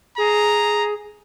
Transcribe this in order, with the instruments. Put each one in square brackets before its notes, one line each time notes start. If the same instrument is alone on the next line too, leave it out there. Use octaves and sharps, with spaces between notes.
[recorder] G#4 [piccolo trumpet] A#5